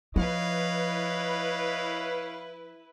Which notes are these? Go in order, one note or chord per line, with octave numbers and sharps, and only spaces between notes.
F3 E4 B4 C#5 D#5 F5